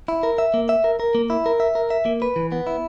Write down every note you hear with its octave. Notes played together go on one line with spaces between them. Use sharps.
E4
A#4
E5
A#3
E5
A#4
A#4
A#3
E4
A#4
E5
A#4
E5
A#3
B4
E3
B3
E4